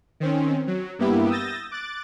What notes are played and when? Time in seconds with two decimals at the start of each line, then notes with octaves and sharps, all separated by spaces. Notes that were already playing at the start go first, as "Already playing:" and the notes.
0.20 D#3 C4 C#4
0.67 F#3
0.99 G2 A#3 B3 E4 G4
1.29 D#6 E6 G6 A6 A#6
1.71 D6 F#6 A6